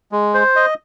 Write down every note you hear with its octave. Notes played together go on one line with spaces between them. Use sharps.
G#3
C5
D#5